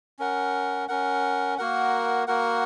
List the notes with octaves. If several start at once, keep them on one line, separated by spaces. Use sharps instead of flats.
C#4 A#4 F#5
C#4 A#4 F#5
A#3 F#4 A#4 F#5
A#3 F#4 A#4 F#5